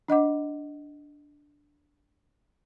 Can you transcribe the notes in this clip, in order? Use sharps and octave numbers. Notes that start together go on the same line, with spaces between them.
D4 D#5 F#5 D6